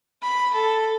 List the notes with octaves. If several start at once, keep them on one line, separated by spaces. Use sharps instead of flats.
B5
A4